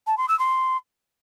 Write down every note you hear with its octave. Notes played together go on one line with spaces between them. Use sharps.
A5
C6
E6
C6